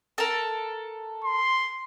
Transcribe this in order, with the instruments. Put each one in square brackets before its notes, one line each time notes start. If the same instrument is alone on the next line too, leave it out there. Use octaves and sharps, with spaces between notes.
[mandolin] A4 A#4
[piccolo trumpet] C6